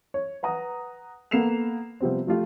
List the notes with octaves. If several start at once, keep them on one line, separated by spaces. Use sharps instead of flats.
C#5
B4 F#5 A#5 D#6
A#3 B3 A4 C7 E7 F7
C3 F3 G3 B3 C4
F3 A3 F4 G4